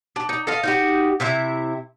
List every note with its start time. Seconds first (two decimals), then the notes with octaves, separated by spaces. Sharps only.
0.16 D4
0.29 D#4
0.47 A4 D#5 F5
0.64 D#4 F#4 G4
1.20 C3 E4 E5